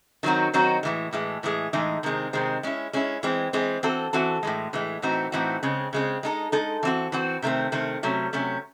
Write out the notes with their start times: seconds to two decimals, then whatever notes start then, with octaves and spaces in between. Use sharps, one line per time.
0.23 D#3 F#3 C4 D#4 F#4
0.54 D#3 F#3 C4 D#4 F#4
0.83 A2 E3 G#3
1.13 A2 E3 G#3
1.43 A2 E3 G#3 D#4 G#4
1.73 A2 E3 G#3 D#4 G#4
2.03 C3 D#3 G#3 C4
2.33 C3 D#3 G#3 C4
2.63 G#3 C#4 E4
2.93 G#3 C#4 E4
3.23 E3 G#3 C4
3.53 E3 G#3 C4
3.83 E3 C4 F#4 A4
4.13 E3 C4 F#4 A4
4.43 A2 E3 G#3
4.73 A2 E3 G#3
5.02 A2 E3 C4 D#4 F#4
5.32 A2 E3 C4 D#4 F#4
5.63 C#3 G#3 C4
5.93 C#3 G#3 C4
6.23 G#3 D#4 A4
6.52 G#3 D#4 A4
6.83 E3 C4 F#4
7.12 E3 C4 F#4
7.42 C3 D#3 A3 C4
7.72 C3 D#3 A3 C4
8.03 C3 F#3 A3 C#4
8.33 C3 F#3 A3 C#4